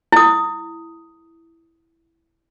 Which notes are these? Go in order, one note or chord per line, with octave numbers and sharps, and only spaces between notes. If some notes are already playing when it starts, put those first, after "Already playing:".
E4 D#6